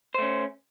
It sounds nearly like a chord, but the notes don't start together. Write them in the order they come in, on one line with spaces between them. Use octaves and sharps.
C5 A3 C#4